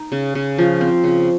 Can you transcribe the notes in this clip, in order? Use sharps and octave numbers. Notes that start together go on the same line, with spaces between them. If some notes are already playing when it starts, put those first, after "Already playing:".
Already playing: D#4
C#3
C#3
F3
C4
C#3